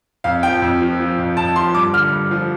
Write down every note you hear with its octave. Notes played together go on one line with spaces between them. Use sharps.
F2 F5
F3 G5
F2
F3
F3
F2
F2 A5
F3 C6
G2 D6
D3 F6
G2
F3